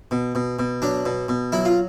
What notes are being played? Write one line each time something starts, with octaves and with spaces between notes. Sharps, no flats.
B2
B2
B2
F#3 D4
B2
B2
F#3 E4
F4